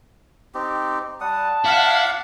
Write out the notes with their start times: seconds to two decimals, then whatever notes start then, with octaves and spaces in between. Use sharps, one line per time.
0.55 C4 D#4 G4
1.21 G3 F#5 A5 D#6
1.65 E4 D5 F5 F#5